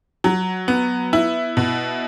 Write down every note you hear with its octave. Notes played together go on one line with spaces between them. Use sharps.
F#3
B3
E4
B2